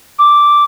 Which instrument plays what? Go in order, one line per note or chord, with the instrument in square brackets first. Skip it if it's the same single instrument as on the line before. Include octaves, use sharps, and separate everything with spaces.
[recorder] D6